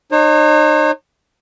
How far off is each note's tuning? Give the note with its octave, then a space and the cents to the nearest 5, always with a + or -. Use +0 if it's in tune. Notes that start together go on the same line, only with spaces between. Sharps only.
D#4 -35 C#5 -45